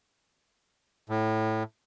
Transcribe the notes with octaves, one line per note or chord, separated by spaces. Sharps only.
A2